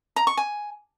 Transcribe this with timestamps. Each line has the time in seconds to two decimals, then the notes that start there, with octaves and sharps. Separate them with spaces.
0.16 A#5
0.27 C#6
0.37 G#5